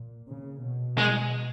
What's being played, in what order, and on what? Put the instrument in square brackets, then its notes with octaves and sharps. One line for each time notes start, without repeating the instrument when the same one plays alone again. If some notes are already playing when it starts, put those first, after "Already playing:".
Already playing: [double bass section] A#2
C#3
B2
[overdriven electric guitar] G#3